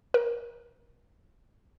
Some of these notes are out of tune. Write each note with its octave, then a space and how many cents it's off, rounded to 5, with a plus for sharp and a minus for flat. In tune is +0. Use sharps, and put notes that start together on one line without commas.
A#4 +30